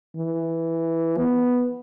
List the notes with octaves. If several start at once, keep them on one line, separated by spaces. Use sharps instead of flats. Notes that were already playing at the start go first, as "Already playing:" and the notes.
E3
B3